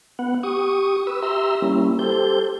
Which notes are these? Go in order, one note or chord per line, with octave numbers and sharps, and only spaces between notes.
B3 F#5
G4 C#6 D#6
B4 E6
G4 E5 A#5 C6 E6
G3 A#3 C#4 E4
G4 A4 C5 G6